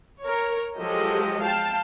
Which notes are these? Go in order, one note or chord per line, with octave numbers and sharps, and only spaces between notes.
A#4 C#5
F3 F#3 G#3 G4 A4 D#5
F5 G5 A5